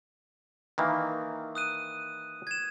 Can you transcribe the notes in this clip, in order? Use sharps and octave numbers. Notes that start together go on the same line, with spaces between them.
D#3 E3 A#3
D#6 F#6 D#7
G#6 E7